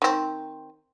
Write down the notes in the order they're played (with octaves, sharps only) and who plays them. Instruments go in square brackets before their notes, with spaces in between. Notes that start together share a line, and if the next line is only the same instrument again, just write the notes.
[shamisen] D#3 C4